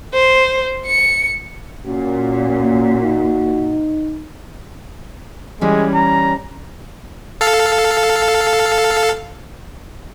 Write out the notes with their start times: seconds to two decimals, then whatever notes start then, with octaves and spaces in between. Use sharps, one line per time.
0.14 C5
0.86 C#7
1.86 A#2 C#4 F#4
3.03 D#4
5.61 E3 G3 G#3 C#4
5.94 A#5
7.41 A4 F5